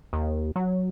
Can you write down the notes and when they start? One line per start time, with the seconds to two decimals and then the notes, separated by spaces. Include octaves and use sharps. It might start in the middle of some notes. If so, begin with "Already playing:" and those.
0.13 D#2
0.56 F#3